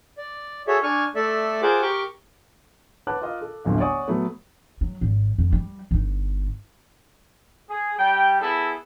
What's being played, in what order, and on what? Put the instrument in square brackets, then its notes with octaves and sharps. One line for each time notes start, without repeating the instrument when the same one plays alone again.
[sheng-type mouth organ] D5
F#4 G#4 A4 C#5 E5
D4 G#5 C#6 F6
A3 A4 D5 E5
F4 G#4 A#4 C5 F#5 D6
G4 A#4 G5 C#6 D6
[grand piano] B4 C#5 F#5 A5 D6 F#6
F4 A#4 D#5 F5
A4
D1 G1 F#2 D3 F5
C#5 D5 F#5 G#5 C#6 D#6
F#3 A3 B3
[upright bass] F#3
G#1
F2
G3
G1 D#4
[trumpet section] G#4
G3 G5
B3 E4 G#4 A4